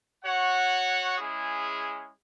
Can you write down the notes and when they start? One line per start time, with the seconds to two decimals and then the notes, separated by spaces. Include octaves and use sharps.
0.24 F#4 C#5 F#5
1.18 G#3 C#4 E4 G#4